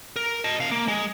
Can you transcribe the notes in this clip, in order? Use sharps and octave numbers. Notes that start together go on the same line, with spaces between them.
A#4
D#5 A5
C3 F5
A#3
G#3